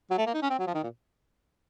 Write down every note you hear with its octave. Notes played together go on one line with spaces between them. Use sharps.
F#3
A3
A#3
D#4
C#4
C4
F#3
F3
D#3
A#2